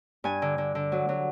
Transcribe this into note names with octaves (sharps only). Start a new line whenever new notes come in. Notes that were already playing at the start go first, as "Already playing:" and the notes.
G2 G#5
D3
D3
D3
F#3
F#3